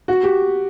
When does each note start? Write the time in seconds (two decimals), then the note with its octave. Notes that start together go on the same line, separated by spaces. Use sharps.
0.08 F#4
0.23 G4